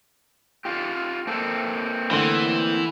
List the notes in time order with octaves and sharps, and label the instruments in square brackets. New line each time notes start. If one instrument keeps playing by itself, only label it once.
[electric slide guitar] F4 G4
A#3 C4 A4
[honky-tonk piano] D3 A3 C6 [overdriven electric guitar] E3